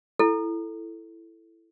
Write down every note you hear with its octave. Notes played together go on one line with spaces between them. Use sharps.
E4 A4